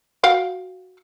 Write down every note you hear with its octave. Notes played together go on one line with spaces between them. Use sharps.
F#4 F5 G5